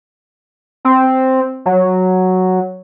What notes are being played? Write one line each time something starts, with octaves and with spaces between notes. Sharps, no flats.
C4
F#3